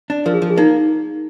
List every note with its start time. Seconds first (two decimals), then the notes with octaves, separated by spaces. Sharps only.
0.10 D4
0.26 F3 A#4
0.34 G#4
0.42 F3
0.50 G#4
0.58 A#3 D#4